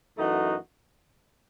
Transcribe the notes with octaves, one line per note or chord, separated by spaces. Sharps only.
F#2 E3 A3 D#4 F#4